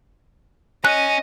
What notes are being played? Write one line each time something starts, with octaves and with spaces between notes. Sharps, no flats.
C#4 D#5 F#6